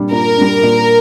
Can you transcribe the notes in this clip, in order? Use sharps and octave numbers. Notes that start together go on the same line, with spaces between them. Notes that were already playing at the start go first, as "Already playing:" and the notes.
Already playing: A#2 G3 D4
A#2 A#4
G3 D4
A#2